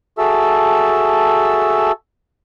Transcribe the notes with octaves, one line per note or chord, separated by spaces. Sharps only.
F#4 G#4 A4 E5 A5 E6